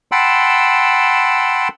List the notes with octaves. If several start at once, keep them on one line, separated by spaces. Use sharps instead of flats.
F#5 G5 A5 B5 C6 E6